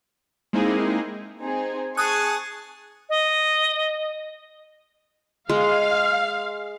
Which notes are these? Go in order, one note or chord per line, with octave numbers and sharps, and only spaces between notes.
G#3 A#3 C4 D#4 E4 G#4
C4 D#4 G#4
G#4 G#5 A5 C#6 D#6 F#6
D#5
G#3 F5